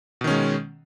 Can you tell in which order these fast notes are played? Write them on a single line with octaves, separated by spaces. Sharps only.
B2 D#3 C#4 G#3